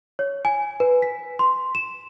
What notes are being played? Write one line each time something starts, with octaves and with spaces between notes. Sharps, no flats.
C#5
G#5
B4
B6
C6
E7